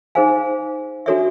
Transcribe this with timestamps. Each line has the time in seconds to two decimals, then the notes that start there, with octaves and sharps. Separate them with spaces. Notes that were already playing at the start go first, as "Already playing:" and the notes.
0.15 D#4 G#4 C5 F5 G#5
1.06 D4 F#4 A4 C#5 E5